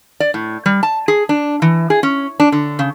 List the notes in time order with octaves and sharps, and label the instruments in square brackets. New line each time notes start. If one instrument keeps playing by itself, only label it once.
[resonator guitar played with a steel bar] D5
A2
G3
A5
G#4
D4
E3
G#4
C#4
D4
D3
C#3